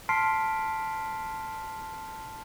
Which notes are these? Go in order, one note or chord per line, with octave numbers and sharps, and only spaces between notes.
A5 C6 F6 B6 C7 D7